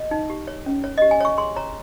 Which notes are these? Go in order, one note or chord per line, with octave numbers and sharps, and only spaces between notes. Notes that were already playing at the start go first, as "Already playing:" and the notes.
Already playing: D#5
D#4
G4
C#5
C#4
C#5
G4 D#5
G#5
C#5 C#6
G#4 C6
C#5 A#5